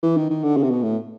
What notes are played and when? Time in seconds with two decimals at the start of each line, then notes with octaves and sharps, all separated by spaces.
0.03 E3
0.17 D#3
0.30 D#3
0.44 D3
0.57 C#3
0.63 C3
0.71 B2
0.83 A2